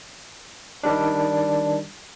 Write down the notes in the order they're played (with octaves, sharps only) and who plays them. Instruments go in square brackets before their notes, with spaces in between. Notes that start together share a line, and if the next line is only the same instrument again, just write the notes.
[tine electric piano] D#3 G3 D4